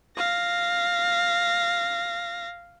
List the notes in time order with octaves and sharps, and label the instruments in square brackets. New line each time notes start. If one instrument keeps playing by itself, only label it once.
[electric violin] F5 A#6